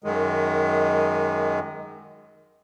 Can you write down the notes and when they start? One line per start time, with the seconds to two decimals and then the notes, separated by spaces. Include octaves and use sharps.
0.04 F#2 D#3 G#3